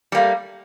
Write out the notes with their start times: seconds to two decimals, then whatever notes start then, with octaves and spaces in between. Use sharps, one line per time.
0.12 G3
0.15 A#3
0.17 A3